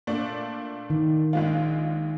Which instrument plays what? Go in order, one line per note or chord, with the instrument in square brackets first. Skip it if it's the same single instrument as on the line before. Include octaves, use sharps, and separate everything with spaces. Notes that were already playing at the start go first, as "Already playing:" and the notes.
[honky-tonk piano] A#2 A3 D4
[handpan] D#3
[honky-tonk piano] A#1 G#3 F4